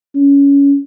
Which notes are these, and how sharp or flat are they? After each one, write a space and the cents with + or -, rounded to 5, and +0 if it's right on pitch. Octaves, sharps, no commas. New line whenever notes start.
C#4 +20